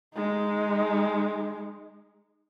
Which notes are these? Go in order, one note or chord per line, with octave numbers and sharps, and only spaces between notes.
G#3 D#4